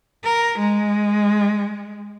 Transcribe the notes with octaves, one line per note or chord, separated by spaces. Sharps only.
A#4
G#3